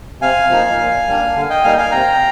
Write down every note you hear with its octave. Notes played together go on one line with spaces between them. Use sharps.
C3 F5 G#5
F3 A#3 D#4
A#2
G3 A#3 D4
D3
D#5 G5
G3 A#3 D#4 F5 G#5
F5 G#5
C3 G5 A#5